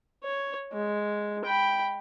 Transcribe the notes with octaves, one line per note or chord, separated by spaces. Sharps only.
C#5
G#3
G5 B5